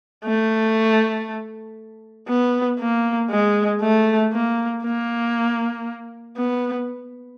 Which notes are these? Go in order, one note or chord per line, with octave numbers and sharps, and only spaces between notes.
A3
B3
A#3
G#3
A3
A#3
A#3
B3